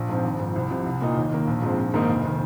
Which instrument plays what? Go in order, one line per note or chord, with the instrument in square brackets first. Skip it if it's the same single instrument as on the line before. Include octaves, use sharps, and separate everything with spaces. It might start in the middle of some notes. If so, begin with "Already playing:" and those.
Already playing: [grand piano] A#1
G#2 F3 C4
G#1
G#2 F3
C2
C3 F3
C2
A#2 A#3 D#4
D#2
D#3 A#3
A#1
G#2 F3 G#3 C4
A#1
G#2 D#3 A#3 D#4
F1
D#3